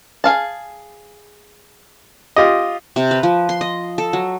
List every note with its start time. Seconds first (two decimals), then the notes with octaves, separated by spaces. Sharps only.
0.24 G#4 F5 A5
2.36 F4 G4 D#5
2.96 C3
3.11 B4
3.23 F3
3.49 C6
3.61 D#5
3.98 A4
4.13 F#3